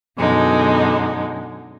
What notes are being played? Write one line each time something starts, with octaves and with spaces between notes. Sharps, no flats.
F#2 B2 D3 G#3 D#4